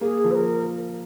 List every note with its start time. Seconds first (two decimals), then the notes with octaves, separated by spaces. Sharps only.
0.01 A#3 G#4
0.24 F3
0.31 C5
0.35 A#4